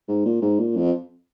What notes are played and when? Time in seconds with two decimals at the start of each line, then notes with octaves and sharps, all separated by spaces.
0.08 G#2
0.25 A#2
0.42 G#2
0.59 A#2
0.76 F2